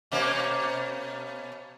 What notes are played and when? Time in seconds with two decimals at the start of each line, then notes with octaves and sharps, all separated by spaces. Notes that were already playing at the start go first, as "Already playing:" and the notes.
0.12 B2 A#3 C#4